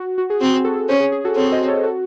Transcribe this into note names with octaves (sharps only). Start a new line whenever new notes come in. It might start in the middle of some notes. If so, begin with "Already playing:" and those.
Already playing: F#4
F#4
G#4
C4 F#4
F#4 A4
C#4 G#4 C5
G#4
G#4
F#4 A4
C4 A4 C#5
C5 D#5
A4 C#5
F#4 A4